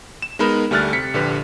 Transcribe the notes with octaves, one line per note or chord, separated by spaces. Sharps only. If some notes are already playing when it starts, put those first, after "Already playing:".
E7
G#3 B3 D#4 A#4 B5
D2 G3 A3 F6 F#6 A6
C3 B6 C#7
A#1 D3 G4 B4